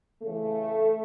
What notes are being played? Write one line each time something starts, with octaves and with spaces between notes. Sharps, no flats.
C#3 E3 A3